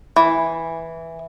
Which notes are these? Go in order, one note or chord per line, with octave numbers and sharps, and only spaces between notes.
E3